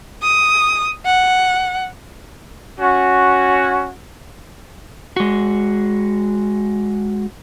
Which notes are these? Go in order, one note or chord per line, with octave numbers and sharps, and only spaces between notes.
D#6
F#5
C#4 F#4
G#3 F#4